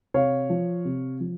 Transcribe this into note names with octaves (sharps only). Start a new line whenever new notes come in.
C3 C#5 F5
F3
C3
F3